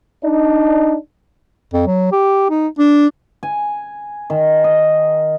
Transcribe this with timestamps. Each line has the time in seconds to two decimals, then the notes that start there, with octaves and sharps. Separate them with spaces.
0.24 D4 D#4
1.73 F2
1.87 F#3
2.12 G4
2.50 D#4
2.79 D4
3.43 G#5
4.30 D#3
4.64 D#5